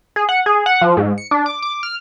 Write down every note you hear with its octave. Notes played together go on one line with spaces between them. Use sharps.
G#4
F#5
G#4
F#5
F3
G#2
C#7
D4
D6
D6
F6